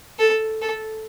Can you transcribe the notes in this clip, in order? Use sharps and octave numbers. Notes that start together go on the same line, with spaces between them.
A4
A4